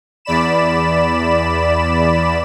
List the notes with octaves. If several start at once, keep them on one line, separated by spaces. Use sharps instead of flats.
E2 D5 B5 E7